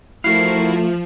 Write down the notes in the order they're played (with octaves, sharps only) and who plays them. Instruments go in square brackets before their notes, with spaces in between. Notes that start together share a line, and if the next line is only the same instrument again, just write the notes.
[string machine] F3 [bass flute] A3 [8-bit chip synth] E4 F#4 A#4 [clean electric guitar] F5